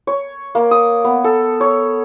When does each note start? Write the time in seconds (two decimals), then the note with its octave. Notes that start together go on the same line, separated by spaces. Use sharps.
0.07 C#5
0.55 A#3
0.71 D#6
1.04 B3
1.24 A4
1.60 C#5